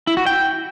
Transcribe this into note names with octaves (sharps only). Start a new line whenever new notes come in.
E4
F#4
G5